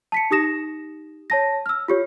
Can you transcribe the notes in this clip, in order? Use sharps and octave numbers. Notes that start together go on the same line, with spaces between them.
A5 B6 C#7
D#4 G4 D#6 A#6 E7
C#5 A5 A#6
E6 F6
F4 G4 C#5